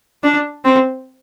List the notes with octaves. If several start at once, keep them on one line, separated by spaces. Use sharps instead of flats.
D4
C4